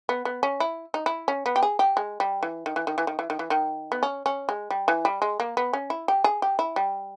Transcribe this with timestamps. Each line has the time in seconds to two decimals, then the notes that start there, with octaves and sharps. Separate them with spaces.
0.09 B3
0.25 B3
0.43 C#4
0.60 E4
0.94 D#4
1.06 E4
1.28 C#4
1.46 B3
1.56 G4
1.63 G#4
1.79 G4
1.97 G#3
2.20 G3
2.43 E3
2.66 D#3
2.76 E3
2.87 D#3
2.98 E3
3.07 D#3
3.19 E3
3.30 D#3
3.39 E3
3.50 D#3
3.92 B3
4.03 C#4
4.26 C#4
4.49 G#3
4.70 G3
4.88 E3
5.05 G3
5.22 G#3
5.40 A#3
5.57 B3
5.73 C#4
5.90 E4
6.08 G4
6.24 G#4
6.42 G4
6.59 E4
6.76 G3